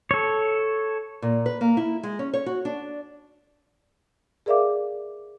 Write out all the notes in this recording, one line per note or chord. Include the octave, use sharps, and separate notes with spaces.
A4 C#5
A#2
B4
A#3
E4
G#3
C#4
C#5
F#4
D4
G#4 A#4 D5 E5 F5 D6